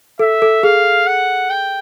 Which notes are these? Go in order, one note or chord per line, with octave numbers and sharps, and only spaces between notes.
A4 E5
A4
G#4 F5
F#5
G5